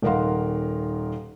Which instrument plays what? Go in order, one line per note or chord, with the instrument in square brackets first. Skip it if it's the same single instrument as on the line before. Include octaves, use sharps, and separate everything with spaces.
[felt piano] D#1 D#3 A#4 F5 F#5 C6